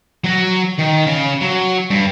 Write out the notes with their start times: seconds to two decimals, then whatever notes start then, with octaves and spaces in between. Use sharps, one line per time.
0.24 F#3 F#4
0.79 D#3
1.07 C#3 F5
1.42 F#3
1.90 G2